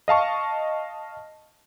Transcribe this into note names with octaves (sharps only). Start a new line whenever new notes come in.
D#5 F5 A5 C#6